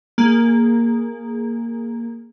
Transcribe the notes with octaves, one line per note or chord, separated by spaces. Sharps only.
A#3 G#4